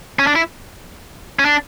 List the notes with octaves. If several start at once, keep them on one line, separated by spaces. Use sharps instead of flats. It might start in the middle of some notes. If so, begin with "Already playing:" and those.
C#4
D4
E4
C#4
D4